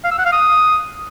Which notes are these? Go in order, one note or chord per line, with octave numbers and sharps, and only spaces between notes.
F5
E6
F#5
F5
D#6